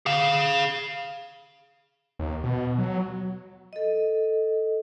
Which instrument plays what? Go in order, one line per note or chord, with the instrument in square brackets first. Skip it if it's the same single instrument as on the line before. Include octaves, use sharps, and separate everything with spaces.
[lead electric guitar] G#4 F5
[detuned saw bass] D#2
B2
F#3
[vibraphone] A4 D#5